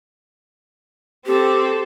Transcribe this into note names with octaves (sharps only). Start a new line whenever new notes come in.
C4 G4 A4